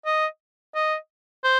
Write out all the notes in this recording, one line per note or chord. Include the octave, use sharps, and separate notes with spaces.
D#5
D#5
C5